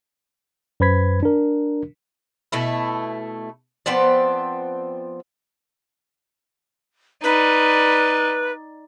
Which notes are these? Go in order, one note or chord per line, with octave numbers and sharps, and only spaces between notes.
F#2 B4 C5 B5 G#6 B6
D4 A#4
B2 A3 E4
F3 B3 C4 D5
D#4 B4 D5